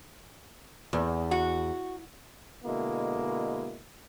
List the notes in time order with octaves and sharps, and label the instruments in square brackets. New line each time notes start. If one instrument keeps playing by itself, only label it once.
[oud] E2
[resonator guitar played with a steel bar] F#4
[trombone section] B2 D3 G#3 A#3 E4